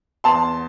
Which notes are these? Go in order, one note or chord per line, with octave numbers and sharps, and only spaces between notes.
E2 A5 C6